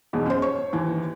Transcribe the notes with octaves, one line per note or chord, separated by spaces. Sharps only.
E2 G#2 B2
F#2 C5
C5 C#5 C#6
D#2 E3